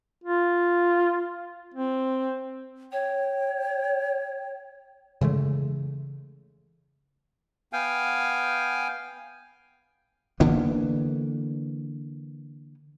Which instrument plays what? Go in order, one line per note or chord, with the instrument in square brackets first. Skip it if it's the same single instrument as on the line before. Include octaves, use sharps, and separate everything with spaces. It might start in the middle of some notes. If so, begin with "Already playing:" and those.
[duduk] F4
C4
[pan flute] C#5 [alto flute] G5
[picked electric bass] C#3 E3 G#3 A3
[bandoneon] B3 F5 G5 G#5
[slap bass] D3 E3 A#3 B3